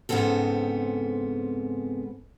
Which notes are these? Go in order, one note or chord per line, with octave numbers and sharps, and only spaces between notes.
G#2 C#3 B3 C4 A4